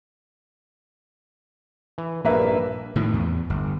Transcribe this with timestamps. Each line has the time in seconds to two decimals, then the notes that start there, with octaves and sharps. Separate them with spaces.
1.98 E3
2.25 A#1 G2 A#3 B4 E5
2.96 A2 D#3 F3
3.14 E2
3.50 G1